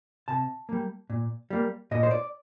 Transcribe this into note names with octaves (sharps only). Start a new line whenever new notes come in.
C3 A5
G3 A#3
A#2
G3 A#3
A#2 D#5
C5
D5